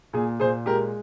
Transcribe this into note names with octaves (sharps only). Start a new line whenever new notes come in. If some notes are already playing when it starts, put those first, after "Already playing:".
A#2 G#4
A#2 G#4 C5
G#3 G4 A#4